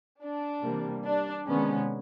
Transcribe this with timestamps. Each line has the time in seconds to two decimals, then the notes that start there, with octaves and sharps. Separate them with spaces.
0.22 D4
0.64 C3 E3 G3 A#3
1.05 D4
1.46 C3 D#3 G#3 B3 C#4